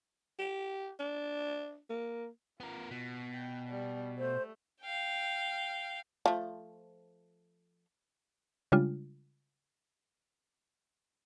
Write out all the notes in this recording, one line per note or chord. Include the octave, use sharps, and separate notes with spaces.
G4
D4
A#3
B3 F4 A#4
B2
G5
G3
A3 C5
F5 G5
F3 A3
C#3 G3 G#3 D4 F4